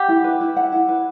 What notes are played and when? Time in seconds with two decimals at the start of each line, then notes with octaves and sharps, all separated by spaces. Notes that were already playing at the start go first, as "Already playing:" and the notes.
Already playing: G4 F#5
0.08 E4
0.24 B4
0.41 E4
0.56 F#5
0.72 E4
0.89 B4